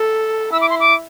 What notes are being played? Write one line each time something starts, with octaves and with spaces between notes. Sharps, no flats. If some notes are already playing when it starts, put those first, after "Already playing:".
Already playing: A4
E4 E6
D6
C6
D6